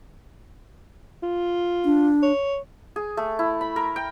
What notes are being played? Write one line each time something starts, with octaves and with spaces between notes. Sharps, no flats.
F4
D4
C#5
G#4
A3
E4
B5
A#4
G5